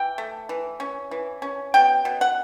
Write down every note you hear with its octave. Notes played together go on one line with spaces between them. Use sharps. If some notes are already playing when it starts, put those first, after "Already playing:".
Already playing: E3 G5
A3
E3
C#4
E3
C#4
B2 G5
B2
F#5